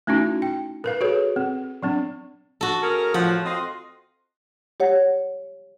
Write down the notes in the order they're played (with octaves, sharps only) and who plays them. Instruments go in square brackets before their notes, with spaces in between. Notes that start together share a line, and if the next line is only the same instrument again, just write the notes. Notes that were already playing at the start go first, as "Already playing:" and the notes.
[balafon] A3 C#4 D#4 E4 F#4
G5
A#4 B4 F5
F#4 G#4 A4 B4 C#5
C4
F#3 C4 D4
[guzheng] F#4 A4
[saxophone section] C#4 G#4 A#4
[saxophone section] A2 F3 [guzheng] F#5
[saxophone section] C4 F4 D#5
[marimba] G4 C#5 F#5